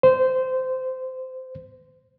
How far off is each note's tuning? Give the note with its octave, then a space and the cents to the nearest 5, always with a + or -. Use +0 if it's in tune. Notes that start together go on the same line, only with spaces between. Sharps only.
C5 -20